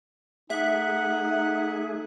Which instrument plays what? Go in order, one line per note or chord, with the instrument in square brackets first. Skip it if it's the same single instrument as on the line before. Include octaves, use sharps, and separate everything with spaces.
[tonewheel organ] A3 G#4 [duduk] D#4 [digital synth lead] E5 [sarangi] F#5